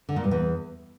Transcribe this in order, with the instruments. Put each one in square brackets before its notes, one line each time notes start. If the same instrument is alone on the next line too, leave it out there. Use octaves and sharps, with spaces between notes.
[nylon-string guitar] D3
A#2
G2
E2